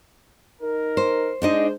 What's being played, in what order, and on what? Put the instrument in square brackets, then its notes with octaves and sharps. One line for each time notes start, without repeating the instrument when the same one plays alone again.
[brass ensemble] D#4 A#4
[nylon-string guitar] C5
[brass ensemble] G#3 C5 [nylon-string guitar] D4 D#4 D#5